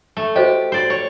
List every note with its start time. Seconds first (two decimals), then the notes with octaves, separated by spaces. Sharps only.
0.17 A3
0.36 F#4 G4 C5 D#5
0.72 F#4 C5 D5
0.90 C#5